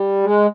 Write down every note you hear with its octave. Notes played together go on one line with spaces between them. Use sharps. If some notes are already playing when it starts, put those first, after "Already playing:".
Already playing: G3
G#3